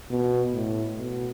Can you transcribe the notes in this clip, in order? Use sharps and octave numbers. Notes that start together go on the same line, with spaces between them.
B2
A2
B2